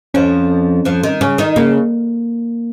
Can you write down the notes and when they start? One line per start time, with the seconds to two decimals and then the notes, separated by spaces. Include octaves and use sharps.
0.14 F2 F3 C#4
0.85 F2 F3
1.03 D#3
1.21 C#3 C#4
1.38 D#3 D#4
1.56 C#3 A#3